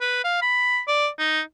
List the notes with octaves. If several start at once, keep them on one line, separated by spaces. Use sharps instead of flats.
B4
F5
B5
D5
D#4